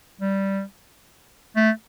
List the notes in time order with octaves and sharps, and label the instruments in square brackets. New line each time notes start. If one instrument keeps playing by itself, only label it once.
[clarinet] G3
A3